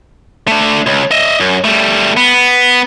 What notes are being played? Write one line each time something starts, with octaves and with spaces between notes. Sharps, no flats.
A3 D4
C#2
D#5 E5
F#2
G3 A3
B3